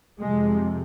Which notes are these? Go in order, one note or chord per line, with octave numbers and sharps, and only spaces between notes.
F2 C3 G#3